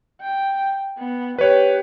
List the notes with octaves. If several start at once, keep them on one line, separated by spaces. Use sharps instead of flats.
G5
B3
G4 B4 C#5